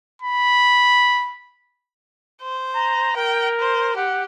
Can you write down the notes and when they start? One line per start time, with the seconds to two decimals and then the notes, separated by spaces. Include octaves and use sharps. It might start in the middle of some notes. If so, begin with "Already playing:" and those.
0.22 B5
2.42 C5
2.75 A#5
3.16 A#4 G5
3.60 C5
3.96 G4 F#5